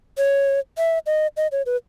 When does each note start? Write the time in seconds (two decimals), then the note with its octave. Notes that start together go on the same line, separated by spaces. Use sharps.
0.18 C#5
0.78 E5
1.06 D#5
1.37 D#5
1.52 C#5
1.66 B4